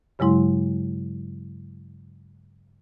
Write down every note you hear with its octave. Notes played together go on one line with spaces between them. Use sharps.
G2 C#3 F#3 G#3 E4 C6